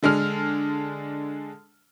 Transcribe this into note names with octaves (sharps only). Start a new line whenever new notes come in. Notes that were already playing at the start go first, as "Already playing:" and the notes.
D3 G#3 D4 F6